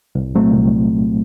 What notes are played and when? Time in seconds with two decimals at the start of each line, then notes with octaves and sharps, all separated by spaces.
0.15 C2
0.35 A#2 F#3 A3 C4
0.54 C2